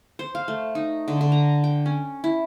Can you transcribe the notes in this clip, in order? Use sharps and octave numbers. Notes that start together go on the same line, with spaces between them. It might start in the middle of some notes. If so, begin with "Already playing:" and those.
C5
F5
A3
D#4
D3
D3
A#5
G5
C#4
E4